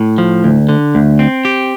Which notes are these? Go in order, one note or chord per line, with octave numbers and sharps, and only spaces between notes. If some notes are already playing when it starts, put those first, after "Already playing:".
Already playing: A2
F3
D2
D3
D2
C4
G4